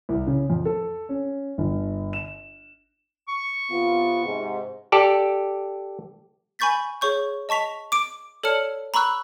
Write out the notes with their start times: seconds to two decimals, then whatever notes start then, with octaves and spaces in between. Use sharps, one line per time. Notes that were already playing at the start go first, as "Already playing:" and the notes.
0.09 C2
0.27 C#3
0.50 F2
0.65 A4
1.09 C#4
1.58 G1
2.13 E7
3.28 C#6
3.70 C3 B3 F4
4.24 G#2 C3 G#3
4.92 G4 A4 D5
6.59 G#5 B5 C#6 G6 A6 B6
7.01 G#4 C#5 C#6 G6
7.49 D#5 A5 C#6 B6 F7
7.92 D6 D7
8.43 A4 C#5 D5 A5 F6 C#7
8.94 A#5 B5 C#6 E6 F#6